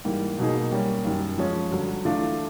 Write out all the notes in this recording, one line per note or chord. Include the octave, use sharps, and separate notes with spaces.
G#2 E3 G3 A#3
B2 F#3 A#3 D#4 G#4
G3 A#3 C#4
F#2 D#3 G3
F3 G#3 C#4
G2 D3 F#3
E3 A3 D4 F4